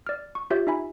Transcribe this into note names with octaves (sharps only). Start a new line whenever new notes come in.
D5 F6
C#6
F4 G4 C#5 E5 G6
D#4 E5 G#5 B5